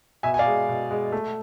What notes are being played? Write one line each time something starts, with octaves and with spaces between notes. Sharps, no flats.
B2 E5 G#5
G#5
D5 F5
G#3
B2
G#3
A3